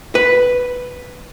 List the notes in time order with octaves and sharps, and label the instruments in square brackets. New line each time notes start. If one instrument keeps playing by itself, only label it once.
[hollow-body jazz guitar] B4